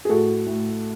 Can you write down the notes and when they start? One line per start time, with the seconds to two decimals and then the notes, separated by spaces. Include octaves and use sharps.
0.05 G#4
0.09 A2 F#4 A4
0.46 A2